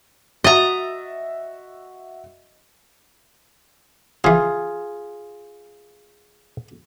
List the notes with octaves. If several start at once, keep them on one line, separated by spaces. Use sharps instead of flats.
F#4 D#5 E5 A#5 A6
C#3 E3 F4 G#4